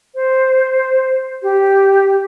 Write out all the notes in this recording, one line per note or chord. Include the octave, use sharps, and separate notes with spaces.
C5
G4